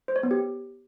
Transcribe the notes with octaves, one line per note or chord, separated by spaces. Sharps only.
C5
C#5
B3
G4